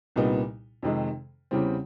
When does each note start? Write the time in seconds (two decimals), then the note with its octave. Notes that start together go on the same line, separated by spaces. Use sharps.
0.16 C2 A#2 G3 B3 D#4
0.82 F2 C3 D#3 G#3
1.51 E2 C#3 E3 G3 C4